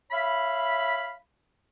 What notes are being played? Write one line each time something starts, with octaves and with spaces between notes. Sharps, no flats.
C#5 E5 F5 B5